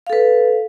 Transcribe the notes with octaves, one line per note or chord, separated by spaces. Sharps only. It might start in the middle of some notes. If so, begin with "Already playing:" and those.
A4 B4 F5